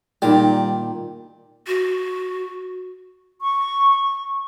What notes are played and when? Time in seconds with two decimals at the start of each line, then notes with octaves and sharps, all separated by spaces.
0.22 A#2 D#3 G3
1.67 F#4
3.42 C#6